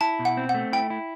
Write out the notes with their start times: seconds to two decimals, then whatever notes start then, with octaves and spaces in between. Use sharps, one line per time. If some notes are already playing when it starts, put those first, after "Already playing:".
0.01 E4 A5
0.19 B2
0.25 F#5
0.37 C4
0.49 F#5
0.54 A3
0.72 E4 G5
0.90 E4